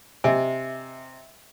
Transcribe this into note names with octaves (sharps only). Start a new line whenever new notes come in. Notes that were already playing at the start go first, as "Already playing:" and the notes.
C3 D#5 E5 G#5